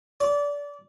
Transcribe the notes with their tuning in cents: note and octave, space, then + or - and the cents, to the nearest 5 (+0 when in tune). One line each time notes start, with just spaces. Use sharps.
D5 -25